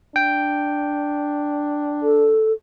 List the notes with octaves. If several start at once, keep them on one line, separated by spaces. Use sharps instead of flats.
D4 G5
A4